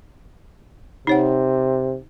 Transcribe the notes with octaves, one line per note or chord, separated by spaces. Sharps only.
C3 D#4 C#5 F#5